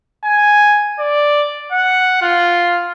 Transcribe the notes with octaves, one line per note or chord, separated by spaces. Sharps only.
G#5
D5
F#5
F4